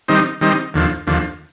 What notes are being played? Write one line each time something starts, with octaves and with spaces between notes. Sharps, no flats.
D#3 G3 C4 D#4
D#3 G3 C4 D#4
D#2 D3 F3
D#2 D3 F3